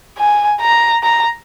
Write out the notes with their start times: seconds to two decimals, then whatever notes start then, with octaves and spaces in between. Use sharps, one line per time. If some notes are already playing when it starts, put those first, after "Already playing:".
0.18 G#5
0.61 A#5
1.03 A#5